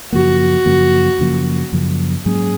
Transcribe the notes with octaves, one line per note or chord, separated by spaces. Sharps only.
F#2 C#3 F3 A#3 F#4
F#2 C#3 F3 A#3
F#2 C#3 F3 A#3
F#2 C#3 F3 A#3
G#2 F#3 A#3 C#4 G#4